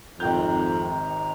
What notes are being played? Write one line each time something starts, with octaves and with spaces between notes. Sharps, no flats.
G#1 F2 C3 D#3 G5 A#5 G6